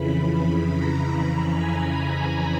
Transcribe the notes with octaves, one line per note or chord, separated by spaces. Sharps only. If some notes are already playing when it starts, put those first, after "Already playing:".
Already playing: F2 C#3 E3 B5
A#5
B5
G#5